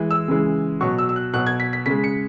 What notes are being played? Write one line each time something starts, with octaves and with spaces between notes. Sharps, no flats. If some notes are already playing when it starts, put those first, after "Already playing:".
Already playing: E3 G#3
E6
C#3 E3 G#3
B2 F#3 C#6
E6
E6
F#6
B2 F#3 F#6
G#6
B6
B6
C#3 G#3 B6
C#7